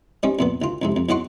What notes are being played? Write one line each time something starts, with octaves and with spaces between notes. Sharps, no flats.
G3 C4 C#4 D#4
F2 A#2 B3
D2 F4
F2 G#2 C3
F2
E2 F#3 D#4 F#5 C6 C#6